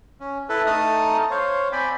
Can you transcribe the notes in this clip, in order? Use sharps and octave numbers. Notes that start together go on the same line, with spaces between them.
C#4
E4 A4 B4
A3 D#4 A5 A#5 D#6 F6
C5 C#5 F5
C4 D5 G5 G#5 B5